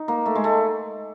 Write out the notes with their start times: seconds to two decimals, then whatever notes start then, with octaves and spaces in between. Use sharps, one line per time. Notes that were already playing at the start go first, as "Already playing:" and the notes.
Already playing: D#4
0.08 A#3
0.26 A3
0.35 G#3
0.44 A3